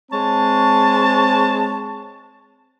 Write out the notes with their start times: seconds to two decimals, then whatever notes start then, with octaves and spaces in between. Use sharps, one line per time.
0.12 G#3 C4 C#5 A5